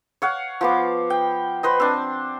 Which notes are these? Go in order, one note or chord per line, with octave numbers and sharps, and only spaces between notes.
C#5 F5 F#5
F3 B3 D6
G5
B4 C5 D#5
C4 D4